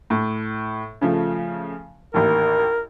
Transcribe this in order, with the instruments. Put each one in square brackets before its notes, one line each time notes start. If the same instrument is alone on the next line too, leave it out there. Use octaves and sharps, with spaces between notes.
[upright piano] A2
C#3 F3 A3
[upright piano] A1 D#2 [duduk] A#4